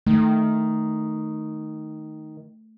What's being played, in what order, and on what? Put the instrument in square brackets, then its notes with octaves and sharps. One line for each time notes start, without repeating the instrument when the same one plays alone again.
[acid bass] D#3 [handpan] A3